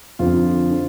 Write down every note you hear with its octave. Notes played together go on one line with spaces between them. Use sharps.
F2 D3 F4
D3